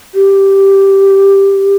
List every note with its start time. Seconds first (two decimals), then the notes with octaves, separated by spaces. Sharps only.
0.14 G4